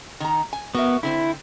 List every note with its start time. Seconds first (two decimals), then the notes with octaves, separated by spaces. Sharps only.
0.20 D#3 A#5
0.53 G#5
0.75 B3 F#4 A#4 E5
1.03 D3 C4 E4 C5